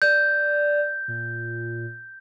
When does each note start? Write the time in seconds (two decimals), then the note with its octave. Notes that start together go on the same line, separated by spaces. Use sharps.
0.02 D5 G6
1.08 A#2